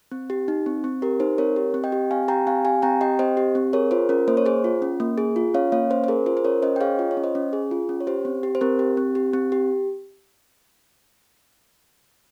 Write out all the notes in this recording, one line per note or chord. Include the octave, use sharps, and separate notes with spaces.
C4
G4
D#4
C4
C4
G4 A#4
D#4 C5
C4 A#4 C#5
G4
C4
D#5 G5
G4
C4 F5 G#5
G4 G5 A#5
C4 F5 G#5
G4 F5 G#5
C4 G5 A#5
G4 D#5 G5
C4 C5 D#5
G4
C4
G#4 A#4 C#5
F4 C5
C#4 A#4
A#3 C5
C#5
G#4 C5
F4
C#4
A#3
G#4
F4
C#4 C#5 F5
A#3 C#5 F5
C#4 C5
C5
G#4 A#4
F4 C5
C5
C#4 A#4 C#5
C#4 C5 D#5
G5
G#4 C#5 F5
F4 D#5
C#5
C#4
C5 D#5
C#4
G#4
F4
C#4
C#5
G4 C5
C4
G4
C5
C4 A#4
G4
C4
G4
C4
G4